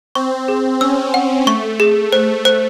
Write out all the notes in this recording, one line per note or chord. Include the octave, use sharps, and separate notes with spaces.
C4 C#6
G#4
C#4 E6
F#5
A3 C#6
G#4
A3 C5
C5